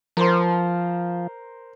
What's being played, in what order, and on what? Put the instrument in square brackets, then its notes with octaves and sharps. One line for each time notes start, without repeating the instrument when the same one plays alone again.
[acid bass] F3 [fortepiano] A#4 C5 C6